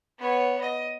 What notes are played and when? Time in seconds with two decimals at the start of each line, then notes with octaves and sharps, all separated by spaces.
0.19 B3 C#5
0.61 D#5